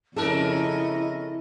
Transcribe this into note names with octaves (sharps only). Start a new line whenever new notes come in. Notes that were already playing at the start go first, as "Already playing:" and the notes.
F2 C#3 A3 C#4 E4 A4 A#4 D#5